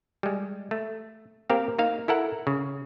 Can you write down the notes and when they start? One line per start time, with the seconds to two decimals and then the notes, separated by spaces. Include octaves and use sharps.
0.23 G3 G#3
0.71 A3
1.50 A#3 C4 G4 A#4 F5
1.79 A#3 D#4 F5
2.08 E4 A4 A#4 F#5
2.47 C#3